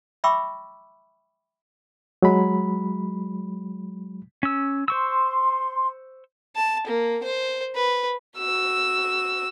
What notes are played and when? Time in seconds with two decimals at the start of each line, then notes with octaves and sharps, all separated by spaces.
0.24 E5 G5 B5 C#6 D6 E6
2.22 F#3 G#3 B5
4.43 C#4 E6
4.88 C5 C6 C#6 E6
6.56 A5
6.87 A#3
7.23 C5
7.75 B4
8.37 F#4 E6